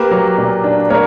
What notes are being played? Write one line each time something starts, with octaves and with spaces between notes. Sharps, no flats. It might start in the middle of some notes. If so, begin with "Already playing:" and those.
Already playing: A#3 G4 B4
F#3
A#2
D4
A#3 A#4 C#5